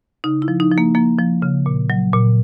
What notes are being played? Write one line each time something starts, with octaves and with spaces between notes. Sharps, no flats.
C#3 D#4
E4
F3
D#4
F3
A#3
F3 A#3
F3
C#3
A#2
F#3
A#2